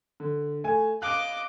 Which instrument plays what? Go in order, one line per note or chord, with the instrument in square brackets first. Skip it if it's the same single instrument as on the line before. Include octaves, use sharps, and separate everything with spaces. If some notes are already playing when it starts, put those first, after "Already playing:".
[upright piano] D3
A3 G#5
[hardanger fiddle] D#5 D6 [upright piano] F5 F#6